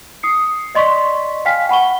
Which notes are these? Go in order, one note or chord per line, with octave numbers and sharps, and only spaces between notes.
D#6 C7 C#7
D5 D#5 C6 C#6 B6
F5 G5 G#5 F6 B6
F#5 B5 C#6 G7